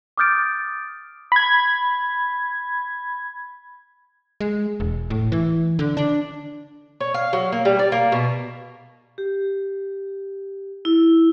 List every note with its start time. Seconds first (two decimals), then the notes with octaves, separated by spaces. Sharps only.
0.18 D6 D#6 F6 G6 A6 D7
1.32 B5 G#6
4.41 G#3
4.80 E1
5.10 A2
5.32 E3
5.79 D3
5.97 D4
7.00 C#5
7.14 F5
7.33 F#3
7.52 A#3
7.65 G3
7.79 D5
7.92 A#3
8.12 B2
9.18 G4
10.85 E4